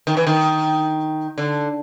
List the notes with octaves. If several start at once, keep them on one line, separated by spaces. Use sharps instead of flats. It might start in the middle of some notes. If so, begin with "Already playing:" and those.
D#3
E3
D#3
D3